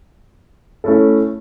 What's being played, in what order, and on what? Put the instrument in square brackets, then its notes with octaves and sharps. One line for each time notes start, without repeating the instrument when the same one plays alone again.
[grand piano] A3 C#4 E4 A4